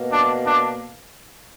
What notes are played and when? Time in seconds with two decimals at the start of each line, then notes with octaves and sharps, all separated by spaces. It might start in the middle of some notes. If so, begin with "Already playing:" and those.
Already playing: B2 A#3
0.11 D4
0.45 D4